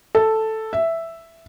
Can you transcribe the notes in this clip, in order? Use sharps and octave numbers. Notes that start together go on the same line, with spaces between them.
A4
E5